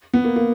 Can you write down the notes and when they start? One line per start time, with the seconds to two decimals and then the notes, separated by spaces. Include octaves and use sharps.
0.14 B3
0.25 A#3
0.36 A#3